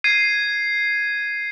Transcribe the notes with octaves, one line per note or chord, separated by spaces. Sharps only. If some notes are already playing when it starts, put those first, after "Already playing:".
G#6 C7 D#7